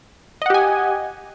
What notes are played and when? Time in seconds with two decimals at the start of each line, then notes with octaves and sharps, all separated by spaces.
0.42 D#5
0.46 F#5
0.50 G4
0.54 G#5